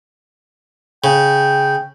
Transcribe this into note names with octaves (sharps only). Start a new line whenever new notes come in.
C#3 G5